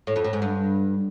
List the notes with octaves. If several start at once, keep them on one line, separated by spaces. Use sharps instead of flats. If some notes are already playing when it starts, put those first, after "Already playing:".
A2
F2
A2
G#2
G2